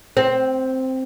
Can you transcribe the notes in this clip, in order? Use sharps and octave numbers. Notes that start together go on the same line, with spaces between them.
C4